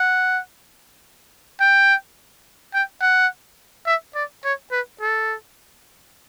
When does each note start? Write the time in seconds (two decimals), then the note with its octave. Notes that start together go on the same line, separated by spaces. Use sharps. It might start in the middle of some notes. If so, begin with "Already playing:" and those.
Already playing: F#5
1.60 G5
2.74 G5
3.01 F#5
3.87 E5
4.15 D5
4.44 C#5
4.72 B4
5.01 A4